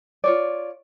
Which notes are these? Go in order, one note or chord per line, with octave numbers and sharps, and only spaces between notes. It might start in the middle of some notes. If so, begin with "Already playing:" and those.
F4 C#5 D5